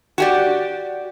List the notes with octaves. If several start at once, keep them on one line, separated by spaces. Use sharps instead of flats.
F#4 G4 D5